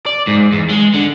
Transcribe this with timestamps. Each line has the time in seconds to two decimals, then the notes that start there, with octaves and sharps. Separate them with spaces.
0.06 D5
0.27 G#2
0.52 E2
0.70 G#3
0.94 D3